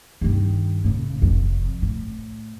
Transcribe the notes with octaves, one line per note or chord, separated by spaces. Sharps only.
G2 D#3
A2 C#3
F1 F2
A2